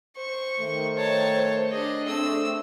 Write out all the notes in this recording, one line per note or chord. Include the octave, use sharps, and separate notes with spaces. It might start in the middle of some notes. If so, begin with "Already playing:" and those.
C5 C#6
D#3 A3
C#5 A5
D4 G#4 D#5
A3 C4 D4 E6